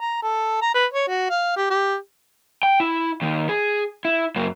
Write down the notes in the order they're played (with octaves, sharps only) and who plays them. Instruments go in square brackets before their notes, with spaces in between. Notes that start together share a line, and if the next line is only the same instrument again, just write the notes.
[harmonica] A#5
A4
A#5
B4
C#5
F#4
F5
G4
G4
[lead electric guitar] G5
E4
D#2 D#3
G#4
E4
F#2 A#3